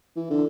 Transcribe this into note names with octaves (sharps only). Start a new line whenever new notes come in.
E3
D3